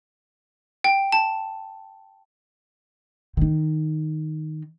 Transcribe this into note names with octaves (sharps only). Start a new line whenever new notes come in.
G5
A5
D#3 D#4